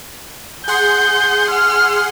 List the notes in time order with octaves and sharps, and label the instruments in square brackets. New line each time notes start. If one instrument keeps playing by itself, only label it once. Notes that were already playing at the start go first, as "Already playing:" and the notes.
[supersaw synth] G#4 F#5 C6 [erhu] G6
[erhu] F6